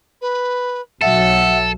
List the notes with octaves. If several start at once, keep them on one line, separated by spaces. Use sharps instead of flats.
B4
B1 F#3 A4 E5 F#5